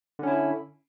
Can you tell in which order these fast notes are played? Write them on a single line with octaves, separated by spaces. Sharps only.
D3 C#4 E4